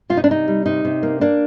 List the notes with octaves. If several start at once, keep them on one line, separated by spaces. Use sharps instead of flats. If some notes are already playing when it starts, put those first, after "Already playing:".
C3 F4
D#4
D4
C3 D#4
G3
C3 D#4
C3
A#3
A#3 D4